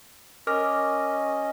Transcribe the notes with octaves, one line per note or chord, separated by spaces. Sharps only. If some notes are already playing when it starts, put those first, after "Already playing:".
C#4 A#4 D#5 D6 F6